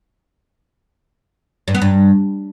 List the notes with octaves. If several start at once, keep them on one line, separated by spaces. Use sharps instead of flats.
G2
B3
G2